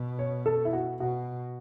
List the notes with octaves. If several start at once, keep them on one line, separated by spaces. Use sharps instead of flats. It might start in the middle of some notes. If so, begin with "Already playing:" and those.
Already playing: B2
C#5
A4
E4
F#4
B2 F#4